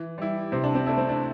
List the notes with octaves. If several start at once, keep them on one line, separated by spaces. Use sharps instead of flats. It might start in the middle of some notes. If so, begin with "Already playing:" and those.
Already playing: E3
G3 E4
C3 C4
D4
C4
A3 D4 E4
C4
D4